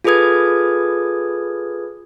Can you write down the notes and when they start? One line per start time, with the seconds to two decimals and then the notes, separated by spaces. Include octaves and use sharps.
0.04 F4 G#4 A4 B4 D#6 G#6